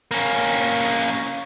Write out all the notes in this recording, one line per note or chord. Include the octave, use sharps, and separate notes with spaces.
A#3 C#4